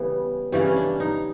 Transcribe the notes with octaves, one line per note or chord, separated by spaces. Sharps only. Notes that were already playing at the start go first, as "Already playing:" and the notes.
Already playing: C#3 E3 G3 B3
C#3 E3 G3 C#4
C#4
D4
D#4